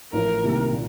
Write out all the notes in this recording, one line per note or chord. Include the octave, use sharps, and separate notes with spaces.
A1 A2 F3 A3 A#4
C2 C3 D#3 A#3
A#2